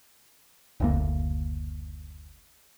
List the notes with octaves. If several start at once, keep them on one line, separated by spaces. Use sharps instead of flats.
F#1 D2 A#3